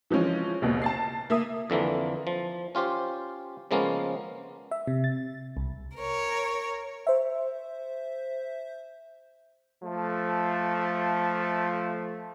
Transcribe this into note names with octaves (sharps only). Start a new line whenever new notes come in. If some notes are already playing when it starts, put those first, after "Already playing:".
E3 F3 G#3 C#4 F4
A#1 D#2 B2
A5 A6 C7
A#3 E5 D#6
F2 D3 E3 A#3
F3
C#4 F4 G4 C5
C#3 F3 G#3 A#3 B3 C#4
E5
C3
A6
C2
A#4 C#5
C5 E5
F3 A3